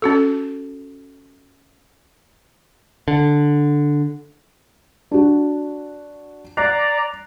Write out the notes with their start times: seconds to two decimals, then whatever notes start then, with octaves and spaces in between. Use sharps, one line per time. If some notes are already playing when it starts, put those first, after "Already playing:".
0.02 C#4 F#4 A4
3.08 D3
5.11 D4 F#4
6.57 D5 A#5 F#6 C7